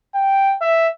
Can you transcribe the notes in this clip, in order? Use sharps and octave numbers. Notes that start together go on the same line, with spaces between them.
G5
E5